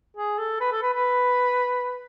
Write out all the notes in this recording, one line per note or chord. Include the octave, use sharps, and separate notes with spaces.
G#4
A4
B4
A4
B4
B4